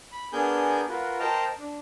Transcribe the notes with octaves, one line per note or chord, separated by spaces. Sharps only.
B5
B3 D4 G#4 A#4 G#5 G6
F4 F#4 A#4 B4
A#4 C5 D#5 G5 A5 A#5
D4